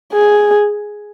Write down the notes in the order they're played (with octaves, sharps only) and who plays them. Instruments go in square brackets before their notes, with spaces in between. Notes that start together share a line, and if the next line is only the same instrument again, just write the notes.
[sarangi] G#4